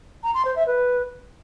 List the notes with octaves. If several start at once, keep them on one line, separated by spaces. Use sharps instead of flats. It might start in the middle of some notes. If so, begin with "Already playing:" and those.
A#5
C6
C5
E5
B4